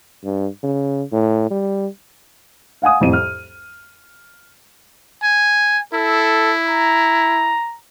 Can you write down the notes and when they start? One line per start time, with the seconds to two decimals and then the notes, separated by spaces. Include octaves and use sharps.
0.24 G2
0.63 C#3
1.12 A2
1.51 G3
2.82 F5 F#5 G#5 D#6
3.01 C2 F2 A2 D#7
3.13 F6
5.23 G#5
5.93 E4 A4
6.67 A#5